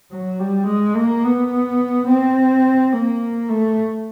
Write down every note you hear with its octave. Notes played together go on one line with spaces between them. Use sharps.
F#3
G3
G#3
A#3
B3
C4
A#3
A3